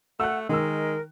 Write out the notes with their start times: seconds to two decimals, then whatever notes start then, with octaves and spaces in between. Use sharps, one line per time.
0.20 A3 F#5 E6 F#6
0.49 D#3 G#3 A#4 E6